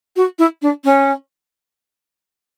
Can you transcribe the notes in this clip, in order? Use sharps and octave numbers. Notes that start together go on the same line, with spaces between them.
F#4
E4
D4
C#4